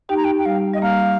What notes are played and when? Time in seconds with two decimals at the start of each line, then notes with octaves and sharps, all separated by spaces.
0.09 D#4 G4 G5
0.17 A#5
0.24 G5
0.38 G5
0.45 G3 F5
0.74 G3 D#5
0.82 A#3 F5